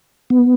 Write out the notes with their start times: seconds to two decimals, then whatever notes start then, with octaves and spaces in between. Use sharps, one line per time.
0.30 B3